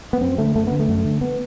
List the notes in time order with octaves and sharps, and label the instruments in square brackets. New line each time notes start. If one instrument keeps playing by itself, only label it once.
[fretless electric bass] B3
F#2 C4
D3 A3
F#2 A3
D3 B3
A3
F#2
D3
B3